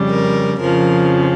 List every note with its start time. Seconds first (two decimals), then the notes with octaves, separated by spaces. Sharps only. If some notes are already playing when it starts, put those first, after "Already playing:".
Already playing: F2 C#3 G3
0.10 A#4
0.60 F2 C#3 F3 A#4